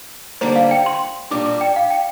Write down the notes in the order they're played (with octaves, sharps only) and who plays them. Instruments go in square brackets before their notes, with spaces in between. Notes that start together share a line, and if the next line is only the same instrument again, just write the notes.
[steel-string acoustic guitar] D3 G3 A#3 [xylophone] C5
[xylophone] F5
G5
C6
[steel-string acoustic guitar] A#2 G3 D4 G4 [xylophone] D6
[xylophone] D6
G5
F5
G5